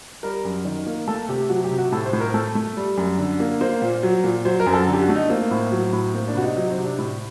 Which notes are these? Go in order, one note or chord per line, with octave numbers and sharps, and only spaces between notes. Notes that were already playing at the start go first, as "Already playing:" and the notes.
G3 A#4
F#2
D#3
A#3
A3 A4
C3 G4
F#3 F#4
G4
C3
F#4
A2 A4
C5
A2
A#4
A3 A4
A3
G3
F#2
D3
A#3
A#3 C5
A#2
F#3
A#2
F#3 C5
A#4
F#2
A4
D3
G4
F#4
A3
D#4
A#3 C4
A2
F#3
A2
A#3 C4
D4
C3 F#4
D#4
F#3 D#4
C4
C3
D4
A2